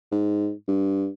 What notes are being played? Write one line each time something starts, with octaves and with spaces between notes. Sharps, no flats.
G#2
G2